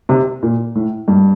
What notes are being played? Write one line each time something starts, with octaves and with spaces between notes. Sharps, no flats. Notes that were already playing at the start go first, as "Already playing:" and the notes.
C3
A#2
A2
G2